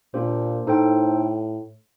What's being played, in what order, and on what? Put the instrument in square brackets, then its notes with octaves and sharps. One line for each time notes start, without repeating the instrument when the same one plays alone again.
[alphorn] A#2 [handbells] A#3 D4 G4 C5
[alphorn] A2 [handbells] D#4 A4 C5 G5